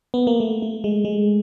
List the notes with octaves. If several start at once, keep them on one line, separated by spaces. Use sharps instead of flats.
B3
A#3
A3
A3
G#3
G#3